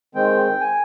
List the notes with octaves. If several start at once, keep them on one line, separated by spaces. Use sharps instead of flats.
D#3 G#3 C4 G5
G#5